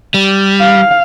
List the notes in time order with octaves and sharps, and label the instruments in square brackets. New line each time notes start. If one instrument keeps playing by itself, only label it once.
[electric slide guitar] G3
[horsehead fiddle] F5